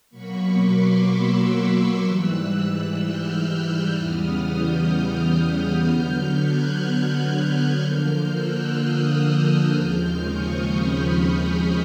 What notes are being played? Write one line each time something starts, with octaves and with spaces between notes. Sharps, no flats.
B2 F#3 A#3 B5 C#6
C6 D6
D6 E6
G#2 E3 G3 E6 F#6
F6 G6
E6 F#6
E2 C#3 E3 G3 B3 D#6 F6
F6 G6
F6 G6
D3 F#3 B3 F6 G6
F#6 G#6
D3 F3 A#3 F6 G6
E6 F#6
D#6 F6
E6 F#6
D#2 C#3 F3 G#3 C4 F6 G6
C#6 D#6
B5 C#6